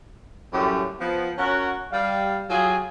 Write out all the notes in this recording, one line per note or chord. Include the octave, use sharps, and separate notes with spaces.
F#2 A2 G3 G4
F3 B3
C#4 F#4 A#4 F#5
G3 F5
F#3 F4 G4 G#4